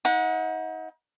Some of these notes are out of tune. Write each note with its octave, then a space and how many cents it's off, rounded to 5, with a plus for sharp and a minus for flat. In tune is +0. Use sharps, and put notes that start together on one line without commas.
D#4 +35 F#5 -25